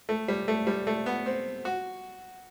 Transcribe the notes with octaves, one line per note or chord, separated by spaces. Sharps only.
A3
G3
A3
G3
A3
B3
C4
F#4